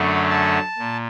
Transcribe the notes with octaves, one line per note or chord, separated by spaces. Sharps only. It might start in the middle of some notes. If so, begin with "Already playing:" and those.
Already playing: F#2 D3 F#3 A3 C#4
A5
A#2